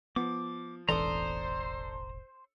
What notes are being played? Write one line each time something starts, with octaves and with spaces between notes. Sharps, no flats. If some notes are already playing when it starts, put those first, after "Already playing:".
F3 B3 D6
E1 A1 E3 D4 A4 C5 A#5 D#6